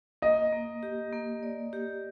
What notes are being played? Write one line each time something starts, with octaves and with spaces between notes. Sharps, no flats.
A#3 D#5
A#3
G4
A#3
D5
G4